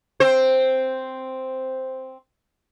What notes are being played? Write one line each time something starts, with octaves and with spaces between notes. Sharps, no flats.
C4 C5